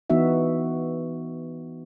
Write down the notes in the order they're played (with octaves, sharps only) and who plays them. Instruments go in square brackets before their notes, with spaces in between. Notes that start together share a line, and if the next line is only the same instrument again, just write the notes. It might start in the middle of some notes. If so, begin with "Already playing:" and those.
[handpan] E3 B3 D#4 F#4 E5